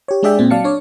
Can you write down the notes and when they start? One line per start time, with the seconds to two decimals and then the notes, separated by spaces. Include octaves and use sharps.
0.08 G4 C#5
0.23 G#3 D4 G#4 D5 E5 G5
0.39 A#2 C4
0.51 F#3 D5 F5 A5 C#7
0.64 D4 C#5 D5